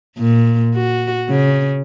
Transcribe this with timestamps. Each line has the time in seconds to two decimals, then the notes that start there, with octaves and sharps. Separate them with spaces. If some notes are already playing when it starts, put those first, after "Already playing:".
0.18 A#2
0.75 F#4
1.29 C#3